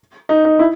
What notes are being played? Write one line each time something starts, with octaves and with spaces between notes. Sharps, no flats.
D#4
D#4
E4